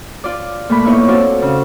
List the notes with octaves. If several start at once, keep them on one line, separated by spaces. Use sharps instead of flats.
F4 D5
A#2 A3 B5
A#3 B3 D#4 E4 C#5
C4 F4 F#4 A4 D5
C#3